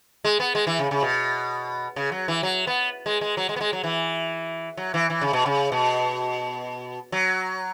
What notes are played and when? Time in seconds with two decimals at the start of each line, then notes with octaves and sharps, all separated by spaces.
0.24 G#3
0.40 B3
0.55 G#3
0.67 E3
0.79 C#3
0.91 C#3
1.02 B2
1.96 C#3
2.12 F#3
2.28 E3
2.43 F#3
2.67 B3
3.06 G#3
3.21 G#3
3.37 F#3
3.49 G#3
3.56 B3
3.61 G#3
3.73 F#3
3.84 E3
4.77 F#3
4.94 E3
5.10 E3
5.21 C#3
5.33 B2
5.46 C#3
5.72 B2
7.12 F#3